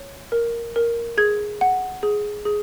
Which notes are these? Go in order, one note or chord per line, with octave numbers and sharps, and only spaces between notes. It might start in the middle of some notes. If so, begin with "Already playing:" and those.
Already playing: C#5
A#4
A#4
G#4 G#6
F#5
G#4
G#4